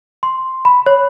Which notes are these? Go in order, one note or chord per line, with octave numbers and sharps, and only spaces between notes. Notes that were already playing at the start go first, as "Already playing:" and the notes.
C6
B5
C#5